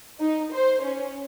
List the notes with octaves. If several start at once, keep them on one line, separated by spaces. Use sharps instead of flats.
D#4
C5
C#4